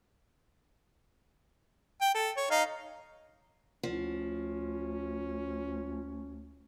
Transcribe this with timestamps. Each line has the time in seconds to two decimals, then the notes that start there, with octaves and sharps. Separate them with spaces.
2.01 G5
2.14 A4
2.37 C#5
2.50 D#4 F5
3.83 D2 F3 C#4